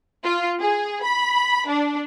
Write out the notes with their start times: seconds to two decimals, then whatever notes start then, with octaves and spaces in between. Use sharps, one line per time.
0.24 F4
0.60 G#4
1.04 B5
1.69 D4